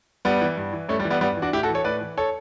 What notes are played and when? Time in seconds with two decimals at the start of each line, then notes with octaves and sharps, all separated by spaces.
0.25 G2 G3 B3
0.41 E3
0.57 G2
0.73 E3
0.89 G2 A3 C#4
1.00 G3
1.05 E3
1.10 G3 B3
1.21 G2 G3 B3
1.37 E3
1.42 D4 F#4
1.53 A2 E4 G4
1.63 F#4 A4
1.68 E3
1.75 A4 C#5
1.84 A2 B4 D5
2.01 E3
2.17 A4 C#5